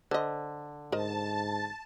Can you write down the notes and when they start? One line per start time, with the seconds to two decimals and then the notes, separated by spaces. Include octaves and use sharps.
0.11 D3 C5 D#5
0.92 G#2 A#4 C5 D#5 A5